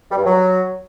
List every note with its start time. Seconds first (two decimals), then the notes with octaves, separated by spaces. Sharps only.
0.10 G3
0.17 G2
0.25 F#3